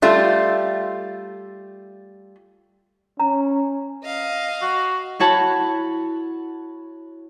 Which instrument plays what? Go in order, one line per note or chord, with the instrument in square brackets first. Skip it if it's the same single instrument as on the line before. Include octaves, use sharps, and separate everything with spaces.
[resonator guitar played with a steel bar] G3 A3 F4
[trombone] C#4 [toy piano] A#5
[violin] D#5 F5
[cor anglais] F#4
[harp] E4 F#4 C#5 A5 B5